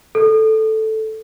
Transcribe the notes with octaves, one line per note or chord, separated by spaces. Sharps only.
A4